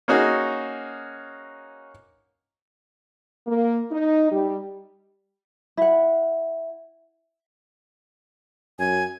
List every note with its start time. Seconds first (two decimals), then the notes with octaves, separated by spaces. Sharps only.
0.08 A#3 C#4 D#4 F#4 G#4
3.47 A#3
3.91 D#4
4.31 G3
5.77 E4 F#5
8.79 F#2 G#5